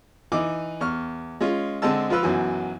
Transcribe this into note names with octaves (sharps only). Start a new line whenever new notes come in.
E3 D#4 D6
E2 C#6 F6
G#3 C#4 F4
D3 G#3 C4 D#5 A5 E6
F3 F4 B4 E6
B1 F#2 E3 F#4